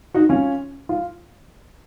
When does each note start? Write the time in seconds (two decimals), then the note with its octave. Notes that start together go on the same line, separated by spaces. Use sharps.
0.14 D#4 F#4
0.29 C#4 F4
0.89 F4